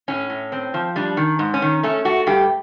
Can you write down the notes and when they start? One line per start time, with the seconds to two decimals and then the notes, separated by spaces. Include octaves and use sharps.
0.08 A2 C#4
0.30 A2
0.52 C4
0.74 F3
0.96 G3 D4
1.17 D#3
1.39 G#2
1.54 C#4
1.62 D#3
1.83 A3 C#4
2.05 A3 F#4
2.27 G2 G4